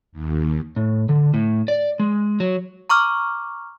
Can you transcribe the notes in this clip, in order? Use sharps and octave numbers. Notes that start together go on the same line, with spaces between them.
D#2
A2
D3
A2
D5
G#3
F#3
A#5 C#6 D6 F6